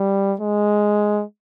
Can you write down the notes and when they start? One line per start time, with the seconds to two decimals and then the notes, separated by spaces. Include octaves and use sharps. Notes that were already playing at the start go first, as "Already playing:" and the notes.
Already playing: G3
0.40 G#3